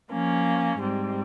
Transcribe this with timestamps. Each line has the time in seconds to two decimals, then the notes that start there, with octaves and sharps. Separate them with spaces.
0.11 F3 A#3 C#4
0.78 G#2 G3 C4